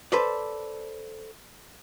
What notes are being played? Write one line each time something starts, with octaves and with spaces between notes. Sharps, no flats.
A4 B4 C5 D5